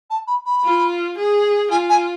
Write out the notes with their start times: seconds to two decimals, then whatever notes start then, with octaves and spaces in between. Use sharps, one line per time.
0.10 A5
0.27 B5
0.46 B5
0.64 F4
1.17 G#4
1.71 F4 G#5
1.89 G#5